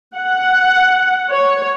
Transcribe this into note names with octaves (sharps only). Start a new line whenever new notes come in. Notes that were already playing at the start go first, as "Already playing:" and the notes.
F#5
C#5